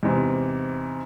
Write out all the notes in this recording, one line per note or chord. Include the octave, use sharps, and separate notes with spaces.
E2 G#2 C3